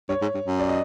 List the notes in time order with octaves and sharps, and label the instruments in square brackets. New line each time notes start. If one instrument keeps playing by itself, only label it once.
[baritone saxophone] G2 [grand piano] C#5
[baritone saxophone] G#2
G2
F#2
[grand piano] D5
D#5